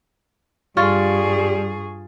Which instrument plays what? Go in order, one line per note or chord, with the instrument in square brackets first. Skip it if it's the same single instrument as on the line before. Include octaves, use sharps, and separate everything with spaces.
[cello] G2 G#4 [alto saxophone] G3 [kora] F4 [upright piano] C#6 A6